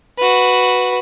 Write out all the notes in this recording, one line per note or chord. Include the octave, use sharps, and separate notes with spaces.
F#4 B4